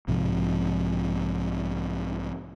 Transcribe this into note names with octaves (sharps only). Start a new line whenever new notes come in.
B1 G#2 C3 F3